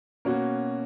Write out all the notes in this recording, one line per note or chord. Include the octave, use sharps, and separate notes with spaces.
B2 A#3 C#4 F#4